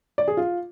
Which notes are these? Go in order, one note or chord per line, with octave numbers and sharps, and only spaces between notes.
D5
G#4
F4